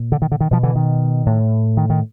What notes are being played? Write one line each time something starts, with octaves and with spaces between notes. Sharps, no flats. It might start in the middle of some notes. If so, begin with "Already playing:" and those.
Already playing: A#2
D3
D#3
D3
D#3
B2 F3
D3 E3
D#3
A2
D#3
D#3